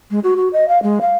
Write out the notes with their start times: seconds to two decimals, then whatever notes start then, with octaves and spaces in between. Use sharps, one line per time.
0.10 G#3
0.23 F#4
0.36 F#4
0.53 D#5
0.68 F5
0.82 G#3
1.01 F5